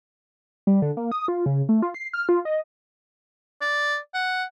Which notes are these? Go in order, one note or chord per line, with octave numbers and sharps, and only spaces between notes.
G3
D3
A#3
D#6
F4
C#3
A3
F4
C7
F6
F4
D#5
D5
F#5